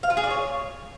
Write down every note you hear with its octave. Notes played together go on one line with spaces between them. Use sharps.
F5
F4
G#4
D5
C#5